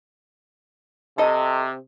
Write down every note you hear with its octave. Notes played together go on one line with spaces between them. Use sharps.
C3 A4 D#5